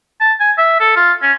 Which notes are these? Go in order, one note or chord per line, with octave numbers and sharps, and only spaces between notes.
A5
G#5
E5
A4
F4
C#4